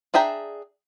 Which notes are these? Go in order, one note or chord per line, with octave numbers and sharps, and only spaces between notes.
D4 G#4 E5 G5 A#5